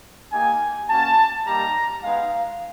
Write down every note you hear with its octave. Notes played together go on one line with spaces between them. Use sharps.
A#3 D#4 G4 G#5
A#3 C#4 F#4 A5
G3 A#3 D#4 G4 A#5
G#3 B3 D#4 F5